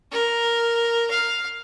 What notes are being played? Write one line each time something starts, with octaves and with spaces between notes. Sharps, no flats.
A#4
F5